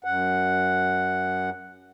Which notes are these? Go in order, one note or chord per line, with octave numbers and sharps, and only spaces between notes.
F#2 F#5